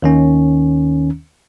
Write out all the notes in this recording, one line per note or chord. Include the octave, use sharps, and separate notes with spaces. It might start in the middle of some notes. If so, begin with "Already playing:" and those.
D#2 D#3 C#4